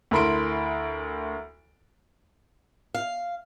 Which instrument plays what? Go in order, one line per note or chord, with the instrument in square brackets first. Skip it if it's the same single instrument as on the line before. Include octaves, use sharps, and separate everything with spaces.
[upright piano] D2 E4 A#4 B5 C6 D7
[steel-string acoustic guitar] F5